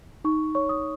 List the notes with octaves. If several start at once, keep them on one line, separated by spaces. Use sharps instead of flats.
D#4 C#6
C#5 C#6
D#6